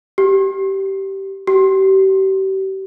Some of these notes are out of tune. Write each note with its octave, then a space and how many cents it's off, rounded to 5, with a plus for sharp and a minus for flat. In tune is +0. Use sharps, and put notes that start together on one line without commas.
G4 -15
G4 -35